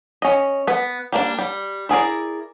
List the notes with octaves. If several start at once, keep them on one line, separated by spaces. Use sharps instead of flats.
C#4 D#5
B3 B4
G3 A#3 D4
G3
E4 G#4 A#4 D5